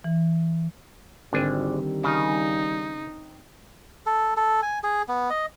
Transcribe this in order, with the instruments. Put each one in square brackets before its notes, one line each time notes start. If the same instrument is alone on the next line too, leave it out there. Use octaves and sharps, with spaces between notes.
[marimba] E3
[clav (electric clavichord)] G#1 D4 G#5 [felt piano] D3 C4 [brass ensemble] D#3 G3
[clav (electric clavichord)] C#3 [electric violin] D#4
[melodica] A4
A4
G#5
G#4
B3
D#5